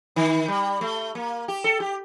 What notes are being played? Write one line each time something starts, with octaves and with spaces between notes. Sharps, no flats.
D#3
G3
A3
A#3
G4
A4
G4